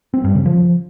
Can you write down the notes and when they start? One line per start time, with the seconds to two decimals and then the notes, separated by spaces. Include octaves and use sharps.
0.14 C4
0.24 G2
0.35 C#3
0.46 F3